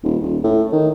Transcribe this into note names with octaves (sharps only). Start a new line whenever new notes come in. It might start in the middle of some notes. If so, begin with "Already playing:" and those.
D#1
D#1
A2
D#3